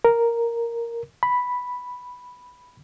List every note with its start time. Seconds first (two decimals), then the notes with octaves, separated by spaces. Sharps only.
0.05 A#4
1.23 B5